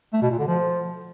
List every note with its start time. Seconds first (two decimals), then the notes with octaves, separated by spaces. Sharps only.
0.13 A3
0.22 B2
0.30 A#2
0.39 D3
0.48 F3